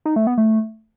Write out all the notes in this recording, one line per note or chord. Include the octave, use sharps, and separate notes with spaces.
D#4
A3
B3
A3